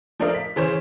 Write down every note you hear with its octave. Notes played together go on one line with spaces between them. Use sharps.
F3 A3 D4 A#4 D#5 F5
B6
C#3 E3 C5 C#5